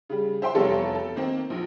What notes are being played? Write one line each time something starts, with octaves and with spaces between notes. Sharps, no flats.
C#3 G3
C5 E5 G5 C6
F1 E2 G3 G4 A4 C#5
A4
D#3 A#3 C4
A#1